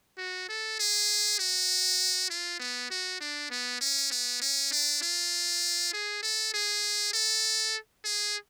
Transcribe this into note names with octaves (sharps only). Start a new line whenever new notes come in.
F#4
A4
G#4
F#4
F4
B3
F#4
D4
B3
C#4
B3
C#4
D4
F4
G#4
A4
G#4
A4
G#4